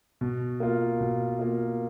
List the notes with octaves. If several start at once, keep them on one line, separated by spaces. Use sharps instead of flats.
B2
A#3 F4
B2
A#3 F4